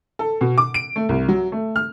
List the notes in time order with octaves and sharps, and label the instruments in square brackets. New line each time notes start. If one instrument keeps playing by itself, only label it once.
[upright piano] A4
B2
D6
D7
A3
C2
F#3
A3
F6